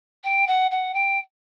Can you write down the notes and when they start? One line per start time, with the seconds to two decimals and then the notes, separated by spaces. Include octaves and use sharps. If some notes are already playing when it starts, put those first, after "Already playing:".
0.24 G5
0.47 F#5
0.71 F#5
0.94 G5